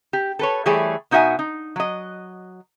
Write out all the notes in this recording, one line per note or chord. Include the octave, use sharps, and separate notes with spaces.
G4
A4 B4 C#5
E3 G3 A3 G#4 A4 C#5
B2 D#4 F#4 E5 F#5 G#5
D#4
F#3 D#5